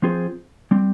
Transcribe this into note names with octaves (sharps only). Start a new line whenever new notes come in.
F3 C4 F4 G#4 C5
G3 C4